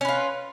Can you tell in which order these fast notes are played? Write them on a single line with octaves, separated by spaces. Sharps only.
C#4 B4 F4